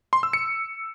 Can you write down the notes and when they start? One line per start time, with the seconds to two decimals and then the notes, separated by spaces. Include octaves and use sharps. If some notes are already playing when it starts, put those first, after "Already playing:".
0.13 C6
0.23 E6
0.33 C#7